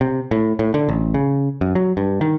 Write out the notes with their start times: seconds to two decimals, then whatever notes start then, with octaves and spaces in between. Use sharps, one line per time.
0.01 C3
0.31 A2
0.59 A2
0.74 D3
0.89 A1
1.14 C#3
1.61 F#2
1.75 F#3
1.97 G2
2.21 D#3